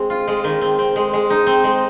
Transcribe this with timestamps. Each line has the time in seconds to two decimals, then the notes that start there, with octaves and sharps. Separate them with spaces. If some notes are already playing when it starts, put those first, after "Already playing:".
Already playing: G#3 C4
0.10 F4
0.28 G#3
0.44 D#3
0.61 C4
0.79 C4
0.96 G#3
1.13 G#3
1.30 D#4
1.47 C4
1.64 G#3